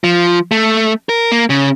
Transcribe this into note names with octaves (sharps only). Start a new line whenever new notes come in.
F3
A3
A#4
A#3
C#3